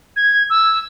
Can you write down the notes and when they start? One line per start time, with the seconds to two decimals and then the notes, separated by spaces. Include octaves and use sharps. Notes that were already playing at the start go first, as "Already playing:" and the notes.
0.16 G#6
0.49 E6